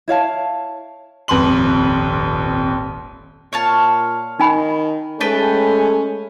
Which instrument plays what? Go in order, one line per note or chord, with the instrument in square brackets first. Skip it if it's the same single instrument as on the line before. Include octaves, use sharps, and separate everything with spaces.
[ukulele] E4 C#5 F5 A5
[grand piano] D#1 G#1 F2 B4 C6 F#7
[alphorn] A#2 [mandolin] C#5 F5 A5
[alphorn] D#3 [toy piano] D#4 G#5 B5
[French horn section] G#3 A3 A4 [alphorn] C#4 [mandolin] B4 G5 A5